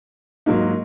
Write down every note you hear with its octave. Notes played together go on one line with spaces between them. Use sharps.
G#2 F#3 A#3 D#4